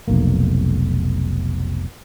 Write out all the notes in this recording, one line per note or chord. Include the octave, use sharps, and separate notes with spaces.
F1 B1 A#3